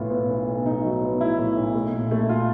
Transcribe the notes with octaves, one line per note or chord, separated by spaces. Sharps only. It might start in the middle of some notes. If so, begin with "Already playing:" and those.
Already playing: B1 A2 B3 F4
B3
B1
B1
B1 D#4
F#3
B3
A2 E4
A2
B1
A3
A#2
A3
F4